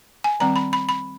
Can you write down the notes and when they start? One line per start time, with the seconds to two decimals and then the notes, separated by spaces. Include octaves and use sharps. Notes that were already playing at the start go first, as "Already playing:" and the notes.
0.24 G#5
0.40 D#3 G3 C4 A#5
0.56 B5
0.73 B5
0.89 B5